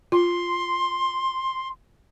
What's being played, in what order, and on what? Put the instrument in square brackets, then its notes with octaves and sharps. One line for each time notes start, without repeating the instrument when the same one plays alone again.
[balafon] F4 [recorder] C6